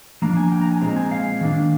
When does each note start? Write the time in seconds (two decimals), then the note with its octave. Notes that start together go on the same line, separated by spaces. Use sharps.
0.22 F3 A#3 D4 A#5
0.37 G#5
0.52 G5
0.61 A#5
0.72 G#5
0.81 A#2 G#3 C4 A#5
0.97 G#5
1.11 F5
1.41 D#3 A#3 D4